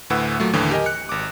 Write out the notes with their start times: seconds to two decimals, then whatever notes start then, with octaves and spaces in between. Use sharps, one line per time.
0.10 D2 A2 B4 F#5 E6
0.40 A#2 F#3 A3
0.53 D#2 A2 D3 E3
0.71 G4 A#4 D#5 G#5
0.86 F#6 C#7
1.09 G#1 D6